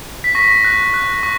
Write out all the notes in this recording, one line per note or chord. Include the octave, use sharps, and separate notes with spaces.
B6
C#6 A#6
F#6
F#6
C#6